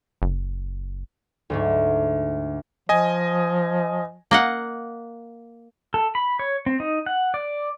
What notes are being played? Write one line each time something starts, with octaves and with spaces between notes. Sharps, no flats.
F#1
D2 G#2 A3
F3 D#5 G#5
A#3 D#5 F#5
A4
B5
C#5
C4
D#4
F#5
D5